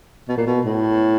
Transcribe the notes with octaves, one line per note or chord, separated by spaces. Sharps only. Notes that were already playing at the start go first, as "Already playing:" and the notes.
B2
A#2
B2
A2